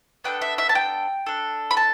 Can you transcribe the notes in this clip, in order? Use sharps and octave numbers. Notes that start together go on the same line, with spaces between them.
B3 D4 A4 G5
E5
E5
A5
G5
D4 A4
B5
A5